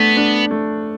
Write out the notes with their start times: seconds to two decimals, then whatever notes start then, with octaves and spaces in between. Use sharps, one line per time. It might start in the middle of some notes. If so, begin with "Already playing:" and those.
Already playing: A3 B3 D4
0.17 D4
0.51 A3